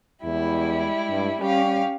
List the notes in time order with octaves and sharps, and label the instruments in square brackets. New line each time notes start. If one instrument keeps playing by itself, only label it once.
[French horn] E2 [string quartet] G3 G#3 E4
[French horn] G2
[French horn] G3 [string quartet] C#4 G4 F5